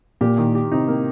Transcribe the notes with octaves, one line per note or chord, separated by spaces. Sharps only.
A#2 G4
D#3
G4
C3 D#4
A#3